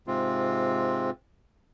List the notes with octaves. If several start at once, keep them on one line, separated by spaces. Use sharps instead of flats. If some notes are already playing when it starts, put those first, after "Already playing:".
G#2 C3 G#3 C4 F4